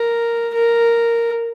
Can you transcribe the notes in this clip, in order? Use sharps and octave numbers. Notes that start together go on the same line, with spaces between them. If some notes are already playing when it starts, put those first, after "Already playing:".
Already playing: A#4
A#4